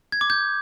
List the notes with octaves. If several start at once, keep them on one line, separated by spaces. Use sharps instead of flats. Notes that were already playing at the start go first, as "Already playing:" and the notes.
G#6
D6
G6